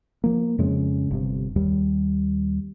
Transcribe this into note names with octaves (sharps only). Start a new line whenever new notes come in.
F3 A#3
F2 C#3 G#3 C#4
G1 C3
D#2 G3